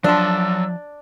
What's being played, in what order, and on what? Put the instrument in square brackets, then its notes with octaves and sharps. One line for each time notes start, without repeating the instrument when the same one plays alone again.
[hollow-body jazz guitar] F3 E5 A5 [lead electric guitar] F#3 C6 [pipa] D4 [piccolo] E6